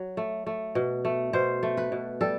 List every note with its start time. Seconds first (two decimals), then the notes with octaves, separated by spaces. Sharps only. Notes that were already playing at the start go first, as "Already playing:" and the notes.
Already playing: F#3
0.17 A3
0.46 A3
0.75 B2
1.05 A3
1.33 B2 C5
1.63 A3
1.77 B4
1.92 B2
2.21 G3 A4